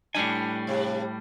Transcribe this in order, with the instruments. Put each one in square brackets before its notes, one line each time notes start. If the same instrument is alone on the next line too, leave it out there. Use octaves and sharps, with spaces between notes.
[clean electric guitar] A2 G3 G#5 [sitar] D4
[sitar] G2 C3